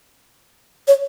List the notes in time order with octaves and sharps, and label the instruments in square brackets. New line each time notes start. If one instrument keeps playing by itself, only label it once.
[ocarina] C#5